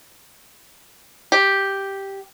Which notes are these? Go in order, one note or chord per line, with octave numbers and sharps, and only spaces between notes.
G4